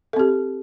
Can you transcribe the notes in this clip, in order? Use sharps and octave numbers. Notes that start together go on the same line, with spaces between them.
C4 G4 A4